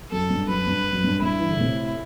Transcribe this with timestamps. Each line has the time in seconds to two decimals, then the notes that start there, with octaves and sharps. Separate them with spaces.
0.11 F#2 A4
0.30 G2
0.48 F#2 B4
0.67 G2
0.93 F#2
1.04 G2
1.22 G2 E4
1.40 E3
1.50 D3
1.59 A2 C3